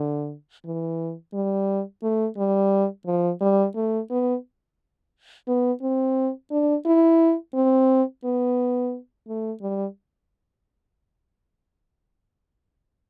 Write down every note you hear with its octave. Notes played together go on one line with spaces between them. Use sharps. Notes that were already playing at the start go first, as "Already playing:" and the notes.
Already playing: D3
E3
G3
A3
G3
F3
G3
A3
B3
B3
C4
D4
E4
C4
B3
A3
G3